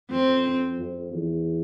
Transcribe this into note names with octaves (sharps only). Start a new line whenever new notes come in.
F2 C4
F2
E2